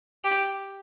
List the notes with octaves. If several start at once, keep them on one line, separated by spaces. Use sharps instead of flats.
G4